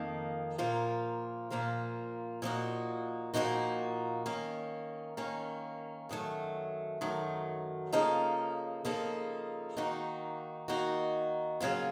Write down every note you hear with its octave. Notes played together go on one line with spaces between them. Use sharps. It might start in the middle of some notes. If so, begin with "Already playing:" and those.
Already playing: F2 D#3 A#3
A#2 F3 A#3 F4 A#4
A#2 F3 A#3 F4 A#4
A#2 F3 A#3 D#4 F#4
A#2 F3 A#3 D#4 F#4
D#3 A#3 C#4
D#3 A#3 C#4
F#2 D#3 F#3 A3
F#2 D#3 F#3 A3
C#3 F3 A#3 D#4 A4
C#3 F3 A#3 D#4 A4
D#3 A#3 D#4 F#4
D#3 A#3 D#4 F#4
C#3 F#3 A#3 F4